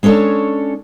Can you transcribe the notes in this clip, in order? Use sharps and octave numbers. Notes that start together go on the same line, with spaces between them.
G#3 C#4 D4 A4 C#5